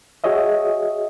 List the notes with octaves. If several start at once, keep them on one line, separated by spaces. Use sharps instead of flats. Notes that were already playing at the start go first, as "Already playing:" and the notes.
F#4 G#4 C#5 D#5 E5